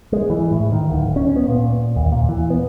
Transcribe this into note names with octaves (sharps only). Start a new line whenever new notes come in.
G#3
E3
A2
D#3
D1
C#4
B3
A#2
D#2
A#2
E3
B3